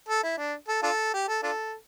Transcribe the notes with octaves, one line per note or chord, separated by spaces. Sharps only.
A4
E4
D4
A4
D4 F4 A4
G4
A4
D4 F4 A4